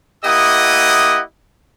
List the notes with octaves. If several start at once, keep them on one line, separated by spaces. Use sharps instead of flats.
A#3 E4 G4 D#5 F#5 D#6